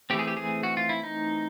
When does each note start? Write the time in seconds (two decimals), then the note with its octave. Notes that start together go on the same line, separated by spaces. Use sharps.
0.10 E3 A3 C4 G4
0.19 G#4
0.28 G4
0.37 G#4
0.63 F#4
0.77 F4
0.89 E4
1.03 D#4